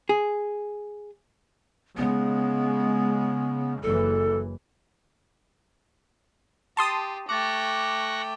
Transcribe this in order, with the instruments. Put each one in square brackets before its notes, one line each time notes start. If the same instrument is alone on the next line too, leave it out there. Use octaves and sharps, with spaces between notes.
[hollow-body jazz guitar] G#4
[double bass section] C#3 G#3 [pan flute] B3
[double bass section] F#1 E3 [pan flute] A4
[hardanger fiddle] G4 [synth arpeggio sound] A5 C6 D#6
[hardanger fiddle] A3 G5 [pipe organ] C#6 F#6 A#6 [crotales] D6 A6